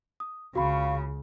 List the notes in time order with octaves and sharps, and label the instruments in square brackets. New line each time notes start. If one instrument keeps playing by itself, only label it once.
[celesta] D#6
[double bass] C#2 [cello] C#3 [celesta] F#4 B5 [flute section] F5 F#5 C#6